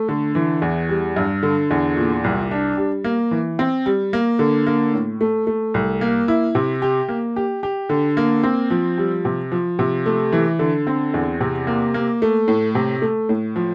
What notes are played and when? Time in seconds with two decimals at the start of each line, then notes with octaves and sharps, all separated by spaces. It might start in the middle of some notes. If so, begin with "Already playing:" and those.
Already playing: A3
0.09 D3
0.35 E3
0.62 E2
0.89 G3
1.16 G2
1.43 D3
1.71 E2
1.97 A#2
2.24 C2
2.51 D4
2.77 G3
3.04 A#3
3.31 E3
3.59 C4
3.86 G3
4.13 A#3
4.39 D3
4.67 A#3
4.94 A2
5.21 A3
5.47 A3
5.74 C2
6.01 A#3
6.28 E4
6.55 C3
6.82 G4
7.09 A#3
7.36 G4
7.63 G4
7.89 D3
8.17 A#3
8.43 C4
8.70 F3
8.98 G3
9.25 C3
9.52 F3
9.79 C3
10.06 A3
10.32 E3
10.59 D3
10.87 C4
11.14 E2
11.41 C3
11.67 A#3
11.94 A#3
12.22 A3
12.48 A2
12.75 C3
13.02 A3
13.29 A2
13.56 F3